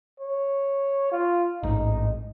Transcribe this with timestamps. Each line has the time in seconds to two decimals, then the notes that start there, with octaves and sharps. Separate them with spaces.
0.20 C#5
1.12 F4
1.63 A1 G#2 D#4